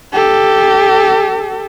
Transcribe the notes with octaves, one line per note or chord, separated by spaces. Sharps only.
G4 A4